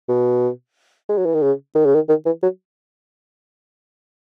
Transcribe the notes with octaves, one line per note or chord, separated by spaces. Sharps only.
B2
G#3
F#3
E3
D#3
C#3
D#3
C#3
D#3
D#3
E3
F#3